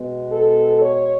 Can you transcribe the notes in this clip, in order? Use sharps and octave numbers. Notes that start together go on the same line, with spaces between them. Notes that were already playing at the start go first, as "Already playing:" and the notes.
Already playing: B2 G#3 B3
A4
C#5